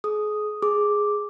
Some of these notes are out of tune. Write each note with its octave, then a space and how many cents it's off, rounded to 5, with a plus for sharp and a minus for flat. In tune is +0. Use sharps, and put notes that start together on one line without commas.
G#4 +35 D#6 +0
G#4 +0 D6 +0